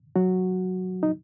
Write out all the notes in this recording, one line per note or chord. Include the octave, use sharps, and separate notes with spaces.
F#3 F#4
D#4